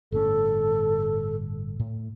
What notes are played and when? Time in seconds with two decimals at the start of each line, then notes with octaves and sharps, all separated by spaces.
0.12 G1 A2 C#4 A4
1.80 A2